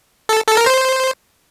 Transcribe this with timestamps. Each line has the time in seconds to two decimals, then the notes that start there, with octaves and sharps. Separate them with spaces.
0.29 A4
0.48 A4
0.57 A#4
0.66 C5